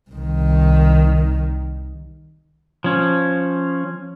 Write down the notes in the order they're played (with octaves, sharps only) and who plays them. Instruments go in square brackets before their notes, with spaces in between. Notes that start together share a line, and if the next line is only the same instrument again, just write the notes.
[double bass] C2 D#3
[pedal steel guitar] F3 C#4